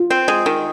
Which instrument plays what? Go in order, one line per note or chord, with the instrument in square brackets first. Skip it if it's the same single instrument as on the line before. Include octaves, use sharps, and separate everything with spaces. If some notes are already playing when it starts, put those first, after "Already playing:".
Already playing: [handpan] F4
[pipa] C4
G#3
D#3